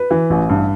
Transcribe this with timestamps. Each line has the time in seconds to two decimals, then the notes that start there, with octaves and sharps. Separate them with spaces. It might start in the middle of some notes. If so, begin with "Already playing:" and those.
Already playing: B4
0.11 E3
0.30 A1
0.49 G2